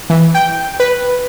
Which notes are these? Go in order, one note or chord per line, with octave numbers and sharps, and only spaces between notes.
E3
G5
B4